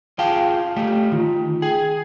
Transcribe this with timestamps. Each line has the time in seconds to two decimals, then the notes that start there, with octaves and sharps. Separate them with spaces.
0.19 F4 G#4 F5 G5 A5
0.76 A3 G4
1.12 D#3 F4
1.62 G#4 G5